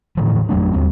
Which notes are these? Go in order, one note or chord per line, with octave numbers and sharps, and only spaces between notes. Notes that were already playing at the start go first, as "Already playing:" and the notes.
A2 D3 E3 F3
F2 F#3 A3 D4
D#2 G3 C4